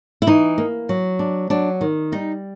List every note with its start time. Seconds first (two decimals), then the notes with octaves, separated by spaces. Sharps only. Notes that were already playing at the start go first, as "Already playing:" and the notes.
0.22 E4
0.27 E3 D#4
0.58 A#3
0.89 F#3
1.19 D4
1.50 F#3 D4
1.81 D#3
2.12 G3 D#4